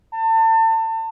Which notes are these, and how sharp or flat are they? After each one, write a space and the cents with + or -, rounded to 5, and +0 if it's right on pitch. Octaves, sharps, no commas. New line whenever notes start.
A5 +35